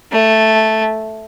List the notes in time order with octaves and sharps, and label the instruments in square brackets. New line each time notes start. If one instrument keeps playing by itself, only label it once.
[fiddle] A3